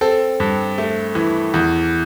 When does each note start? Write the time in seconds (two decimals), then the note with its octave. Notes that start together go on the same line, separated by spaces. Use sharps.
0.01 C4 A4
0.40 G2
0.78 A3
1.15 E3
1.54 E2